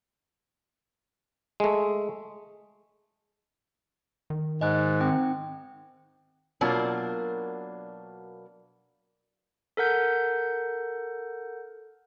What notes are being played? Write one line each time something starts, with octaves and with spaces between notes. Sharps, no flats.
G#3 A3
D#3
G#2 D#5 G#5 F#6
C4 D#4 G5
B2 F#3 A#3 D4 F4 A#4
A4 A#4 F#5 G6